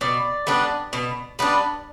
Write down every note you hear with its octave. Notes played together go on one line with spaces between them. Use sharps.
B2 D5
G3 B3 D4
B2
G3 B3 D4